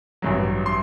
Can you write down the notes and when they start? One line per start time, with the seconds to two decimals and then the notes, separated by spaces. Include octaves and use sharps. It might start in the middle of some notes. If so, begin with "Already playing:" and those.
0.22 A1 G2 F#3
0.66 C6